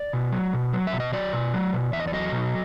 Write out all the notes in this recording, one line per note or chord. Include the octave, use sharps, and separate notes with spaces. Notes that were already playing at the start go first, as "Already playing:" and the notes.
Already playing: D5
B2
F#3
B2
F#3
E5
B2
D#5
F#3 D5
B2
F#3
B2
E2 E5
D#5
D5
F#3 D#5
B2